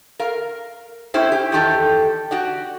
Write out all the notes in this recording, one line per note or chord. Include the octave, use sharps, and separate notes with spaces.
A#4 F5
C#4 E4 G4 C5
G4
E2 D#3 G4 A4
F#4 G4 D5